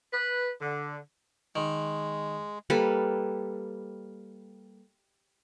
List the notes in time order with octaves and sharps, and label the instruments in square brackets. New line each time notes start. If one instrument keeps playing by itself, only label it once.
[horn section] B4
D3
[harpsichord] D#3 [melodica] G#3
[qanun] G3 A#3 A4 B4